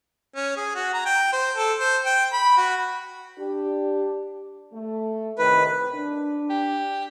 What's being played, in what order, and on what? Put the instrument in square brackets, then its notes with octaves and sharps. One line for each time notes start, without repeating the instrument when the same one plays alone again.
[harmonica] C#4
G#4
F#4
A#5
G5
C5
A4
C5
G5
B5
F#4
[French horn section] D4 G4
A3
[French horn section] A2 C3 D#3 [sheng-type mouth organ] B4
[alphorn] D4
[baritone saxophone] G4